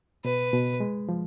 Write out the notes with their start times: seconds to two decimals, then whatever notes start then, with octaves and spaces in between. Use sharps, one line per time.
0.25 B2 B4
0.53 B2
0.80 G#3
1.09 F3